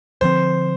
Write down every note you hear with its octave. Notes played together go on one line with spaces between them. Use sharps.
D3 F3 C4 C5